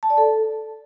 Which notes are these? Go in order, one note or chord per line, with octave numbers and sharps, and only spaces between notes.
A5
D5
A4